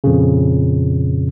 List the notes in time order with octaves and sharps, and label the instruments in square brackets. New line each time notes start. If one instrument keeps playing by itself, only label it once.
[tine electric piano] F2 A#2 C#3